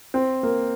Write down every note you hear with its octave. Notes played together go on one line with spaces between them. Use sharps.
C4
A#3